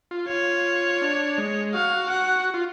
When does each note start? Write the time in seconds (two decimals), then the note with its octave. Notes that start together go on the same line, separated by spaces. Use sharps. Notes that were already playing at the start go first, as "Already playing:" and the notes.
0.11 F4
0.29 F4 C#5
1.02 D4
1.38 G#3
1.73 F#4 F5
2.10 F#5
2.54 F4